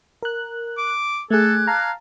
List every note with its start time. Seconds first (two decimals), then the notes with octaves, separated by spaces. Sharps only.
0.23 A#4 F#6
0.78 D6
1.30 A3 G#4 A4 D6 F#6 G#6
1.67 F5 A5 A#5